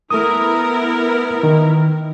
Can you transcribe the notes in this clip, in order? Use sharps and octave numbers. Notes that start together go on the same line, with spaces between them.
A3 B3 E4 A#4 D#6
D#3